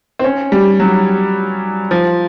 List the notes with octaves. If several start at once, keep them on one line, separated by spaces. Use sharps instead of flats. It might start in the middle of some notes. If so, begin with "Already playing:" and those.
C4
C#4
G3
F#3
F3